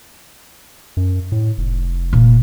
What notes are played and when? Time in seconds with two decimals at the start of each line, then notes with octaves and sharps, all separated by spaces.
0.97 F#2
1.32 A2
1.58 F1
2.13 A#2